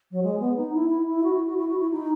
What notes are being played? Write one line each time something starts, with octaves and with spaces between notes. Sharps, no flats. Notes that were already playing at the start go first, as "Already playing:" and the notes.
F#3
G#3
B3
D#4
E4
E4
E4
F#4
E4
F#4
E4
F#4
E4
D#4